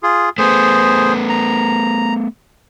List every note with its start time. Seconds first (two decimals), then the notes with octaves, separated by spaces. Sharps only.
0.03 F4 G#4
0.38 A3 B3 G#4 C5
1.29 A#5